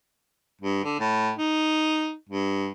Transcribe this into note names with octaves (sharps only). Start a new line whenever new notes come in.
G2
D3
A2
D#4
G2